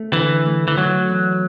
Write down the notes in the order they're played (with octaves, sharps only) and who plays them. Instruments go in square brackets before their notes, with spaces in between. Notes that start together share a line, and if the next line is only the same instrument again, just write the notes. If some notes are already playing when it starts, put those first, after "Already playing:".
Already playing: [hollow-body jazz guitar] A3
[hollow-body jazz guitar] D3 [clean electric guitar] E3
[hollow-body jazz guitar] A3
[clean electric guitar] E3
[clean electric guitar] F#3 [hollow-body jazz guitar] A3
[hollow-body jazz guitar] E2